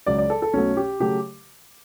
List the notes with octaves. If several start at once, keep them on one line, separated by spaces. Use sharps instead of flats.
C#2 C#3 F#3 D5
D5
A4
A4
B1 B2 F#3 A3 C#4
G4
C#3 F#3 A3 G4